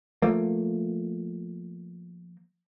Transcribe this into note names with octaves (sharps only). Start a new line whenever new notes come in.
F3 A3 A#3